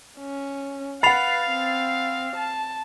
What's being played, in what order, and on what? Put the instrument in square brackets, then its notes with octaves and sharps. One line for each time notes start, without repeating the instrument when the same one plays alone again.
[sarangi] C#4
[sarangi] B4 [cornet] F5 [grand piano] F#5 B5 [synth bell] A6 C7 F7
[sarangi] C4
A5